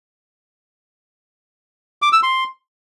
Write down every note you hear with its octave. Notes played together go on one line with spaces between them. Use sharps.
D6
E6
C6